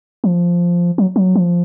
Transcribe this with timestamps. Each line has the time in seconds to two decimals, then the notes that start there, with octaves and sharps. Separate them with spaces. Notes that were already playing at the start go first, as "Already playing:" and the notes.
0.24 F3
0.98 F#3
1.16 F#3
1.35 F3